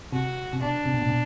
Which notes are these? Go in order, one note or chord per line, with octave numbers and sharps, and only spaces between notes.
C3 F#4
C3
B2 D4
C3
B2
A#2
B2